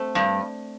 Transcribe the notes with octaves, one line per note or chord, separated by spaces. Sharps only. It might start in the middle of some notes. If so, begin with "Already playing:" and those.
Already playing: A3 C4
G2